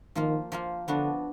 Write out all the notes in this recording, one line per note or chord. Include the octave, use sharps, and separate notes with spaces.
D#3 F3 A#3 F4
F3 A#3 F4
D3 F3 B3 D4 F#4